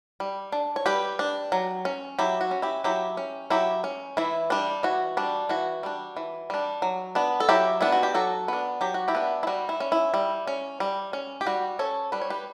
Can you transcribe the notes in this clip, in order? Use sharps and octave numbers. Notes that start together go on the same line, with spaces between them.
G3
D4
C#5
G3 G4 B4
D4
F#3
C#4
F#3 E4 G4
F#4
C#4
E4 G4
F#3 E4 G4
C#4
F#3 E4 G4
C#4
E3 E4
G3 D4
E3 F#4
G3 D4
E3 F#4
G3 D4
E3
G3 D4
F#3
B3 D4
A4
F#3 E4 G4
B3 D4 E4
F#4
G4
F#3 F#4 A4
B3 D4
F#3 G4
F#4
E4 G4
B3 D4
E4
G3 F#4
E4
C#4
E4
G3
C#4
G3
C#4
G4
G3 F#4
C#4 A4 C#5
G3 B4
C#5
G4 B4